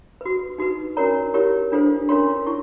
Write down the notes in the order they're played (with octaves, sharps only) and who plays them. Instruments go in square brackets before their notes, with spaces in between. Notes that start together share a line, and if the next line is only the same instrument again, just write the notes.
[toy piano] F#4 B4
D#4 F#4 B4
C#4 F#4 A#4 C#5 A#5
E4 G4 A#4 C#5
D4 F4 A4 C5
C#4 F4 A#4 C#5 C6
E4 C#6